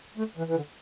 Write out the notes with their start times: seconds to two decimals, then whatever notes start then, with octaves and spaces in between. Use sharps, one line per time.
0.17 A3
0.37 E3
0.48 E3
0.55 D3